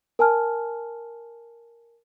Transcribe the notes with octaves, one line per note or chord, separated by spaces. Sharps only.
A#4 G#5 A5 F6